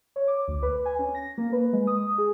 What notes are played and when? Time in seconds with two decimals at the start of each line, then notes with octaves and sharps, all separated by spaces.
0.16 C#5
0.28 D6
0.48 D2
0.63 B4
0.85 G#5
0.99 C#4
1.15 A#6
1.38 A#3
1.52 B4
1.73 G#3
1.87 D#6
2.18 G#4